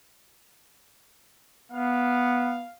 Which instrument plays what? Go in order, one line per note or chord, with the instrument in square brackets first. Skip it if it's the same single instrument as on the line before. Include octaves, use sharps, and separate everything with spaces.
[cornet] B3 [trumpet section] F5